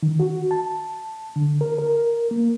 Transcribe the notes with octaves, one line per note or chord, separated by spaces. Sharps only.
D#3
F#4
A5
D3
A#4
A#4
A#3